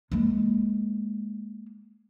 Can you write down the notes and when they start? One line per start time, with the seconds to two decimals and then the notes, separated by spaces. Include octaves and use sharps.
0.12 G#3 A#3